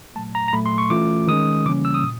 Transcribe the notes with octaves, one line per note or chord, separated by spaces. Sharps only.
A#2 F#3 A3 A5
A#5
A#5
A#2 F#3 A3 B5
C6
C#6
E3 A3 C#4 F4 D6
D#3 G#3 C#4 D#6
C#3 E3 G3 A#3 C#4 D6
E6
D#6
A#2